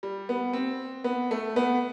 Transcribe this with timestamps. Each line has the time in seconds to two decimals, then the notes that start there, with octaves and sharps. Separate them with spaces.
0.03 G3
0.29 B3
0.53 C4
1.04 B3
1.31 A3
1.56 B3